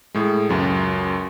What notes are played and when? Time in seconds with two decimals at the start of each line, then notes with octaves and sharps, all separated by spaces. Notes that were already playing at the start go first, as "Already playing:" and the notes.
0.14 A2 G#3
0.49 C#2 F#2 F#3